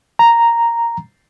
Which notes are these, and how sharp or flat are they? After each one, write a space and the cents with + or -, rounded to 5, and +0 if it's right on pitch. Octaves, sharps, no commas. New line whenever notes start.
A#5 +0